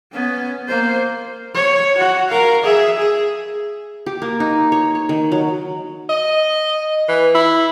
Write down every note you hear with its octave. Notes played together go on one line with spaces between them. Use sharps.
B3 C#4
A#3 C5
C#5
F#4
A#4 F5
G#4 E5
G#4
G4
A#3
D#4
C#5
C#5
D#3
F#3
D#5
E3
E4